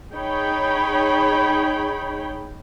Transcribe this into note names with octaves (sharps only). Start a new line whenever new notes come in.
D#4 G#4 C#5 G5 B5